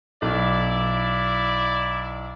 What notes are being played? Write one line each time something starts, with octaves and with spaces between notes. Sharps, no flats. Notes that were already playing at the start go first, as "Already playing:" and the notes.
B1 E4 D5